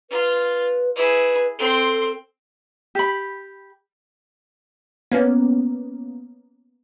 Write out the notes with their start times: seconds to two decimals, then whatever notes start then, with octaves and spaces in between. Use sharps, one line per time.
0.10 F4 B4
0.96 E4 G#4 B4
1.59 C4 A4 C6
2.95 G4 B5
5.12 A#3 B3 C#4